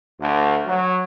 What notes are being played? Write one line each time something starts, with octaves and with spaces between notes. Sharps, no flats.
D2
F#3